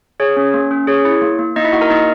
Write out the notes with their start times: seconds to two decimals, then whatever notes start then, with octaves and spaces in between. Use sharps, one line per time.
0.20 G#4 C#5
0.37 C#4
0.54 A#3
0.71 C#4
0.87 G#4 C#5
1.05 E4
1.22 A#3
1.39 A#3
1.56 A#3 D#4 D#5
1.64 E4 E5
1.72 A#3 F#4 F#5
1.81 A#4 A#5
1.90 A#3 D#4 D#5